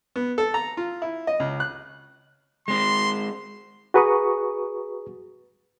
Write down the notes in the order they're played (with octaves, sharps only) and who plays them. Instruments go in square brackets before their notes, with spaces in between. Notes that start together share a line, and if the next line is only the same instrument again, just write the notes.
[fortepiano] B3
A4
A#5
F4
E4
D#5
C#2
F#6
[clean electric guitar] G#3 C4 [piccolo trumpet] C6
[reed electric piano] F#4 G#4 B4 A#5 C#6 D#6